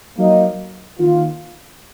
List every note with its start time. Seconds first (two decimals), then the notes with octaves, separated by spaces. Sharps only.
0.17 F#3 A#3 D#4
0.98 D#3 A#3 F4